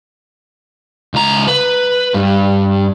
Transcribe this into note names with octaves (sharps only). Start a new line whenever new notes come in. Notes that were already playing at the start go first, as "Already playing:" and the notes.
C#2 A#5
B4
G2